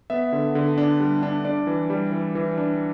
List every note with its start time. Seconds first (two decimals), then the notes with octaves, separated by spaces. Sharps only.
0.10 B3 E5
0.33 D3
0.55 D3
0.78 D4
1.00 G3
1.23 D4
1.45 D4 D5
1.67 E3
1.90 G3
2.12 E3
2.35 E3
2.58 D4